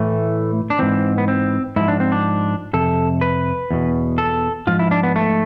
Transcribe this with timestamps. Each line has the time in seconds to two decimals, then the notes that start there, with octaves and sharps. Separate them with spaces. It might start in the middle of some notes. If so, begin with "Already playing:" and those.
Already playing: A2 E3 A3
0.70 D4
0.79 G#2 E3 C4
1.18 B3
1.28 C4
1.76 G#2 F3 E4
1.88 D4
2.00 C4
2.12 D4
2.73 F2 C3 A4
3.21 B4
3.71 E2 B2
4.18 A4
4.67 G#2 F3 F4
4.79 E4
4.91 D4
5.03 B3
5.16 A3